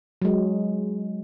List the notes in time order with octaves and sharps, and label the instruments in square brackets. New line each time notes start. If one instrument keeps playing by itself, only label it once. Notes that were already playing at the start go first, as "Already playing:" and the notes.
[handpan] F#3 G#3